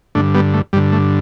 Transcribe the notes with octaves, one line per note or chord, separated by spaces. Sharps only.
G2 D3 A3 D4
G3 B3
A3
G2 D3 G3
A3